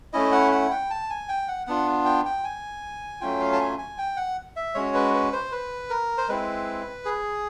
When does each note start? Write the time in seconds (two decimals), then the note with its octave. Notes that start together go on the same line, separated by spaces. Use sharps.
0.13 A3 C#4 E4 D#5
0.32 F#5
0.52 F#5
0.71 G5
0.90 A5
1.10 G#5
1.29 G5
1.48 F#5
1.67 B3 D4 F4 F#5
2.05 G5
2.25 G5
2.44 G#5
3.21 F#3 A3 C#4 F4 G5
3.40 F5
3.53 A5
3.60 G#5
3.79 G#5
3.98 G5
4.17 F#5
4.56 E5
4.75 G#3 C#4 F#4 C#5
4.94 B4
5.14 B4
5.33 C5
5.52 B4
5.90 A#4
6.18 C5
6.29 G#3 C4 E4 B4
7.05 G#4